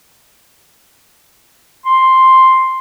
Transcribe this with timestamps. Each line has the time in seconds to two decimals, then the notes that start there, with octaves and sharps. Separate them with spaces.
1.85 C6